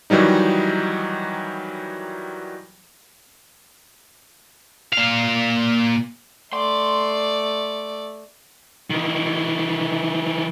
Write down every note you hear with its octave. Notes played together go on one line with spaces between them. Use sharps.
D#3 E3 F#3 G3 D#4
A#2 F5
A3 D5 C6
D#3 E3